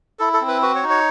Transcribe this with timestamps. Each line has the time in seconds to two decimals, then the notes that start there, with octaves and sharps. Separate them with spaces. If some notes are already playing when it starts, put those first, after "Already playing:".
0.19 E4 A4
0.33 A4
0.41 C4
0.48 B4
0.62 F#4 B4
0.75 C#5
0.83 D#4
0.90 C#5